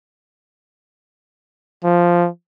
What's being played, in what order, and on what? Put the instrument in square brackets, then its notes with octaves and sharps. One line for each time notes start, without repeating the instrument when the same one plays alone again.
[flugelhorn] F3